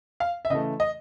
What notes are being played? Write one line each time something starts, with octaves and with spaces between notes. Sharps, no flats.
F5
E5
C#3 E3 A3 D#5
D#5